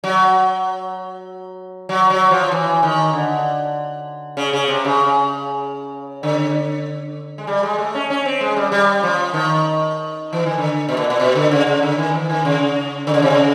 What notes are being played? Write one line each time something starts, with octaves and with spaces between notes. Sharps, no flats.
F#3
F#3
F#3
F3
E3
D#3
D3
C#3
C#3
C3
C#3
D3
G#3
G3
G#3
A3
C#4
C#4
C4
G#3
G3
G3
F3
D#3
E3
D#3
D3
B2
A#2
A#2
B2
D3
C#3
C#3
D3
D#3
E3
D#3
C#3
D3
C#3
C3
C#3